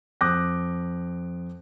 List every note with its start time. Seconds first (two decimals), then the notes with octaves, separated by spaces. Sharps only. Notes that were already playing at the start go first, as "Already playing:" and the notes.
0.21 F2 D6 D#6 F#6 G6 A#6